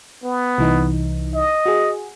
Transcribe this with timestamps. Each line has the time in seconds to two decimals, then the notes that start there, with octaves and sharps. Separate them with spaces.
0.23 B3
0.58 C2 E3 D#4
1.35 D#5
1.66 F#4 G#4